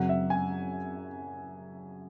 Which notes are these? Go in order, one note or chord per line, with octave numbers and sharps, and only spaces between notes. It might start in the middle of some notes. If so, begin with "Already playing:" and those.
Already playing: F#2 C#3 F#3 C4 F#5
E5
G#5